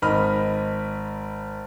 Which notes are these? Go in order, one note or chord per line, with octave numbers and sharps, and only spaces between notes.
G#1 D#5 B5 F6